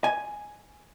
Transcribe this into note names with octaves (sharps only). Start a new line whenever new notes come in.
G#5